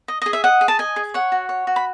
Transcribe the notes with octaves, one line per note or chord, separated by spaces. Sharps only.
D#5
G#4 D#5
E5
D#5 F#5
G#4
A5
D#5 G#5
G#4
C#5 F#5
F#4
C#5
F#4
B5